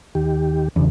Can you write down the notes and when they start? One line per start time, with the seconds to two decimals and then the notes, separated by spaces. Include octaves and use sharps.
0.15 D#2 D#3 G4
0.76 E2 C#3 D4